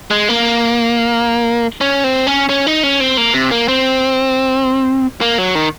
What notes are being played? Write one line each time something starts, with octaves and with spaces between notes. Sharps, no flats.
G#3
A#3
C#4
C4
C#4
C#4
D#4
C#4
C4
A#3
C3
A#3
C4
A#3
F#3
D#3